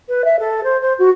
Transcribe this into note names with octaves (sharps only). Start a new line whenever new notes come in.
B4
E5
A4
C5
C5
F#4